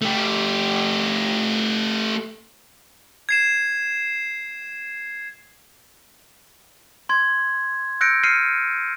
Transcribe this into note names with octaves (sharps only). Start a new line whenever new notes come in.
A3 G4
G#6 C7 E7
C6 G#6
E6 F#6 G6 A#6 C#7 D7
F6 C7 C#7 D#7